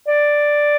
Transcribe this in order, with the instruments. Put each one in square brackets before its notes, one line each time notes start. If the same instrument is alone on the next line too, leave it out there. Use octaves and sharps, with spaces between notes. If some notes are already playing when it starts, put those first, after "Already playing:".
[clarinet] D5